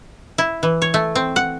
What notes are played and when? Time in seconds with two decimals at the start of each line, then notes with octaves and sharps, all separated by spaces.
0.38 E4
0.63 E3
0.82 C#5
0.94 A3
1.15 C4
1.36 F#5